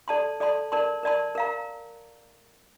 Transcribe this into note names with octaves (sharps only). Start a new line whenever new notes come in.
A4 D5 A5 C6
A4 D5 A5 C6
A#4 D5 A5 C6
A#4 D5 A5 C6
A#4 F5 A#5